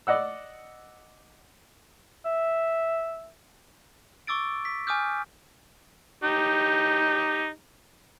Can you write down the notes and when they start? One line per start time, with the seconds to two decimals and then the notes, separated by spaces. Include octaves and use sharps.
0.07 D5 D#5 F#5 E6
2.25 E5
4.27 C#6 D6 E6 A6 D7
4.65 B6
4.87 G#5 D6 D#6 F6 G6
6.24 D#4 G4